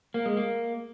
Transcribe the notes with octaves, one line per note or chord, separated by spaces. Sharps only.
A#3
G#3
A#3